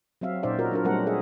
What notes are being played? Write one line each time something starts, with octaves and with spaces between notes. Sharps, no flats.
F#3 C4 E5 F5
A#2 C#4 D#4 C5 D5 E5
F4 F#4 A#4
F#3 D4 A#4
F#3 G3 A3 C4 A#4 F#5
G#4 E5